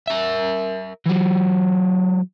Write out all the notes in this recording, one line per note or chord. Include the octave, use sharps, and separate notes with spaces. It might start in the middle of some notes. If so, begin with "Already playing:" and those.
A#4 E5
E3 F#3